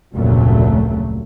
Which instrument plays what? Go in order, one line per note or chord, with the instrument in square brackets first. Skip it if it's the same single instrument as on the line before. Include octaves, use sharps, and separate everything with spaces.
[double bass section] F1 D2 A#2 C#3 F#3 A3